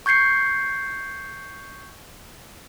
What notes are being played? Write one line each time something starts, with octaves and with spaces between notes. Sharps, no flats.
C#6 G6 G#6 C7 C#7